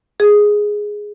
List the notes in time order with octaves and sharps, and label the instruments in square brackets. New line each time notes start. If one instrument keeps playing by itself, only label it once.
[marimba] G#4